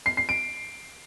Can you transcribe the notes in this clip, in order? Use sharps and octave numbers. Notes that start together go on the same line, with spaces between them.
C7
C7
D7